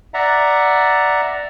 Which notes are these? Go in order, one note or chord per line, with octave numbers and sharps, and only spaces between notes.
D5 E5 F#5 A#5